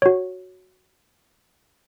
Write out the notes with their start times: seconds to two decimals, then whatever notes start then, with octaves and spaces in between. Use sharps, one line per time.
0.02 F#4 C#5